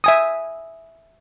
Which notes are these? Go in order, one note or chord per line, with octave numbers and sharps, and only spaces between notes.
E5 G#5 D#6